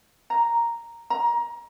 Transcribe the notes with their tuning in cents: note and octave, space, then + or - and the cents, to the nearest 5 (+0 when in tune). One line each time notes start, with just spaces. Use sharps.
A#5 +0
A#5 +20